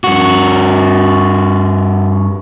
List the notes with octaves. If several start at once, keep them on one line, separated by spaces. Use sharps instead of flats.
G2 F#4